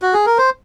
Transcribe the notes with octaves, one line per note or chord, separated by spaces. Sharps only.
F#4
G#4
A#4
C5